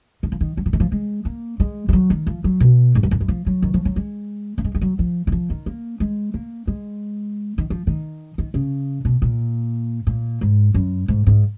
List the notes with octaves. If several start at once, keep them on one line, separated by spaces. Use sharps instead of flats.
D#3
F3
D#3
F#3
F3
D#3
F3
G#3
A#3
G#3
G#3
F#3
D#3
F3
F#3
B2
G#2
F#2
F2
F#2
F3
F#3
D#3
F3
F#3
G#3
A#3
G#3
G#3
F#3
F3
D#3
F3
D#3
A#3
G#3
A#3
G#3
D#3
F3
D#3
D#3
C#3
B2
A#2
A#2
G#2
F#2
G#2
G#2